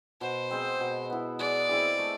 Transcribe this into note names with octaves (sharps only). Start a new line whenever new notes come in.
B2 C5
G#3 C4
B2
B3 E4
G#3 D5
C4 E4 G#4
A3